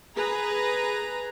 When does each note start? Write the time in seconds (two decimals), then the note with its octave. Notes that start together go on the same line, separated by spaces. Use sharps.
0.16 G#4 B4 A#5